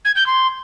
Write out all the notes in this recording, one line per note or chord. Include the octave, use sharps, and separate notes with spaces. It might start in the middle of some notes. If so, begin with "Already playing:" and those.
G#6
G6
C6